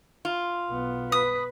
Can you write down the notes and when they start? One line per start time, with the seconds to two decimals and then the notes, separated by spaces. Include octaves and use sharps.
0.25 F4
0.69 B1 B3
1.12 B4 D#6